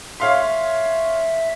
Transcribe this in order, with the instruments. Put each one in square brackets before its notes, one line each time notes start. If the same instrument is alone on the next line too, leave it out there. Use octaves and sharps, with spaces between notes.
[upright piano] C#5 F5 C6 [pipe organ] E5